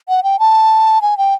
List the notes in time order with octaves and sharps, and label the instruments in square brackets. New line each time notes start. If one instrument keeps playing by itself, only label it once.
[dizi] F#5
G5
A5
G#5
G5